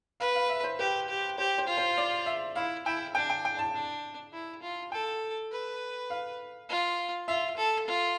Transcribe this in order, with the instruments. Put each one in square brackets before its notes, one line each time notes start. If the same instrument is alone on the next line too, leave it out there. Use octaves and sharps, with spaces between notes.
[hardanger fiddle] B4 [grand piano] F5
[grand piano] F5
E5
C5
[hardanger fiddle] G4 [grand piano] B4
[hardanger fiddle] G4
[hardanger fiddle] G4 [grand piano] C5
[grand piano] C5
[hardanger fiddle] F4
[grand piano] C5
D5
E5
[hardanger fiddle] E4 [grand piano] F5
[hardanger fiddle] E4 [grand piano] G5
[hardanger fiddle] D4 [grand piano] G5
[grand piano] G5
G5
A5
[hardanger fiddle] D4
E4
F4
[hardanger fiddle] A4 [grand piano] G5
[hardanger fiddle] B4
[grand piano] F5
[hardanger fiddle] F4
[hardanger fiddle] F4 [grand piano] E5
[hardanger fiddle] A4
F4